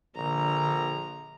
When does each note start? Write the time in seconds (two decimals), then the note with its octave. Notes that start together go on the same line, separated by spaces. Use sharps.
0.15 A#1 D3 A#5